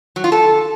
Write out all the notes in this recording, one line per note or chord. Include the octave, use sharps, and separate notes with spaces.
F#3
F4
A4